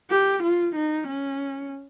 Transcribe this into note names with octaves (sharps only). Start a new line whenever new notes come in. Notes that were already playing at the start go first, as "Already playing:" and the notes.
G4
F4
D#4
C#4